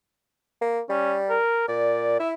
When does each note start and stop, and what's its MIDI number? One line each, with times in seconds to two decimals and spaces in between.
0.61 0.81 58
0.89 1.38 55
0.89 1.15 61
1.30 1.65 70
1.68 2.18 46
1.68 2.19 74
2.20 2.34 64
2.20 2.29 76